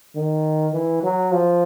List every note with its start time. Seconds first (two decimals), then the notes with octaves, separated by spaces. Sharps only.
0.16 D#3
0.73 E3
1.03 F#3
1.32 F3